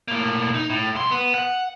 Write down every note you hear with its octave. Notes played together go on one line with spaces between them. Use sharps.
A2 A#3
D#4
A2
C2 C6
B3
F#5